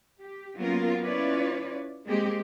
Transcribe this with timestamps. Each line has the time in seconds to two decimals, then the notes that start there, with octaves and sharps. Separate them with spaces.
0.20 G4
0.59 F#3 A#3 B3 C#4 F4 A#4
1.04 C#4 E4 F4 B4 C#5 D5
2.06 G#3 A#3 C4 G4